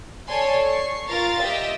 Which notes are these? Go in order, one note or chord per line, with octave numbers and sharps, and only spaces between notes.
A4 C#5 D5 G#5 C6
C#6 C7
F4 A#4 F5 A6
G4 D#5 E5